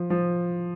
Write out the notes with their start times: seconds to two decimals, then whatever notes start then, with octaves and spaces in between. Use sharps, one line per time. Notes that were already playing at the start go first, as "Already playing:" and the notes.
Already playing: F3
0.10 F3